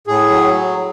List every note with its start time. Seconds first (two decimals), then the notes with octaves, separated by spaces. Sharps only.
0.07 A2 G#4
0.30 F#3